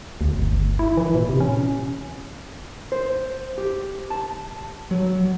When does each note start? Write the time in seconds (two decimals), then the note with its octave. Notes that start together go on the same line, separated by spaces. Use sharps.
0.21 D2
0.35 G1
0.79 E4
0.97 E3
1.15 A#2
1.29 C3
1.40 C#4
2.92 C5
3.58 G4
4.10 A5
4.91 F#3